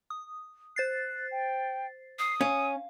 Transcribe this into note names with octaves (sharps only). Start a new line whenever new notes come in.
D#6
C5 F#6 A6 C7
G5
D#6 C7
C#4 F5 D#7